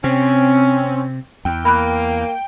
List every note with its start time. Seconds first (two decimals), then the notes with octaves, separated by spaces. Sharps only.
0.04 C3 C4 C#4
1.45 E2 G5
1.65 A#3 B5 F#6